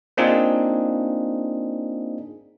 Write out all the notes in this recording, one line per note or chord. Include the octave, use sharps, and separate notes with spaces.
A#3 C4 D4 D#4 F4 G#4